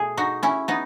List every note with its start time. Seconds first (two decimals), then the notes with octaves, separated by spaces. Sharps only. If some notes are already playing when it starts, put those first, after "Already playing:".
Already playing: B2 A3 G#4
0.17 D#4 F#4
0.43 C#4 E4
0.68 B3 D#4